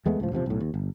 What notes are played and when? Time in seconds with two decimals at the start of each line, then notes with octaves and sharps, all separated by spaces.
0.06 E2 G#3 A3 B3
0.20 C#2 A2 F3
0.32 E1 C3 D#3 F3
0.46 B1 A2
0.60 D#2
0.74 G1